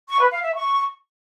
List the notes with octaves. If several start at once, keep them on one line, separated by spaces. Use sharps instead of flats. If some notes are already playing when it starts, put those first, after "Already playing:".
C#6
B4
F5
E5
C#6